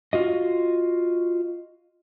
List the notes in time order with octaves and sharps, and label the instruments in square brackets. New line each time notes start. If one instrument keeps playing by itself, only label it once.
[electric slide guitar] F4 F#4 D#5